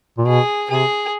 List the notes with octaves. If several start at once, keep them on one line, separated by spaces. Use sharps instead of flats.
A#2
B2 G#4
C3 G#4